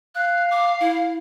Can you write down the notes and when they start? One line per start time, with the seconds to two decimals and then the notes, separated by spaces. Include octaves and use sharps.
0.15 F5 F#6
0.51 D6
0.80 E4